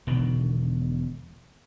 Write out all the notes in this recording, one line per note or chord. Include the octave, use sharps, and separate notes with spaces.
E1 B2 D3 D#3